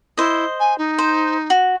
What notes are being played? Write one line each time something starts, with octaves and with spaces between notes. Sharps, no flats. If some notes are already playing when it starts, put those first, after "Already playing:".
E4 C5 D#5
G#5
D#4
C5
F#4